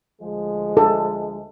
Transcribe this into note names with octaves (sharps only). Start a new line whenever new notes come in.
D2 F3 G#3
A4